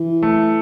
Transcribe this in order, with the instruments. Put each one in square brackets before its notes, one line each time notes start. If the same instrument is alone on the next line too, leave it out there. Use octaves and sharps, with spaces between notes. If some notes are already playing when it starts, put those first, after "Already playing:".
Already playing: [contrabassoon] E3
[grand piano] A3